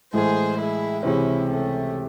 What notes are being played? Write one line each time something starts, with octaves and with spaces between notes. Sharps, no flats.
A2 E3 G#3 G#4 C5
E4 G#4
C#2 C3 E3 C4 C#4 E4
A3 C#4